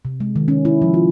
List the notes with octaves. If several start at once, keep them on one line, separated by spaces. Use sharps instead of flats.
C3
G#3
D#3
C#4
E4
F3
F4